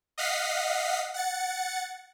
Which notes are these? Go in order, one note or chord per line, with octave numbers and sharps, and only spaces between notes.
D#5 F5 F#5 B6 C7
F#5 A6 C#7